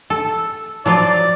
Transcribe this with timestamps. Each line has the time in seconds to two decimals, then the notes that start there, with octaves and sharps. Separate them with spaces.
0.10 A4
0.86 F3 F#3 F4 D5